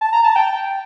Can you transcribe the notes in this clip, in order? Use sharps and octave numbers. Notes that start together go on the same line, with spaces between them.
A5
A#5
A5
G5